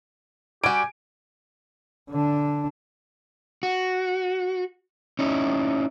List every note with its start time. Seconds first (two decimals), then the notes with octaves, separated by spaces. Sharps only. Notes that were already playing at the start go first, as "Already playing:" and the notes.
0.64 G3 F#4 G4 G#5 D7
2.11 D3 D4
3.63 F#4
5.19 C#4 D#4 E4